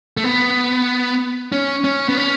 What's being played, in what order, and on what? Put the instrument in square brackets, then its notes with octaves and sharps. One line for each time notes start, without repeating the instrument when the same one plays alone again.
[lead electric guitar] A3
B3
C#4
C#4
B3
C#4